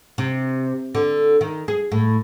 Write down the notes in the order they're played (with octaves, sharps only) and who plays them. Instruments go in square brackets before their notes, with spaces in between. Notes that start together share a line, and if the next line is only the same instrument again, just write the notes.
[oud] C3
D3
D#3
G#4
A2